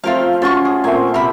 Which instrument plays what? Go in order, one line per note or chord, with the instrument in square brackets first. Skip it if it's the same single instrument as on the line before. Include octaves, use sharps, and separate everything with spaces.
[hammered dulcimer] F3 A3 C4 [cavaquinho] F4 A#4 F5
[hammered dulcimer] C#4 F4 F#5 [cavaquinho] A4 C6 C#6
[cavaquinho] G#4
[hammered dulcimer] A#2 A3 C4 [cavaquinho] G#5
[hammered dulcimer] C3 [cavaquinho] A#4 B5